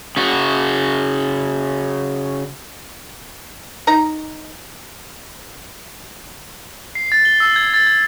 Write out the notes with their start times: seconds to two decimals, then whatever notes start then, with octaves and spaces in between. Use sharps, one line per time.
0.17 C#3 F#4
3.87 D#4 A#5
6.95 C7
7.12 A6
7.25 G7
7.40 E6
7.56 G#6
7.74 A6
7.87 G#6